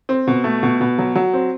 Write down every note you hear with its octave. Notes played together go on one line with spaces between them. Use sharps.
C4
B2
A3
B2
B2
F#3
F#3
C4